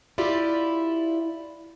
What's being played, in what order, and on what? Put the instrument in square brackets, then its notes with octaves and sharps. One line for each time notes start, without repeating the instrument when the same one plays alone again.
[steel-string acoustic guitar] E4 F4 G4 D5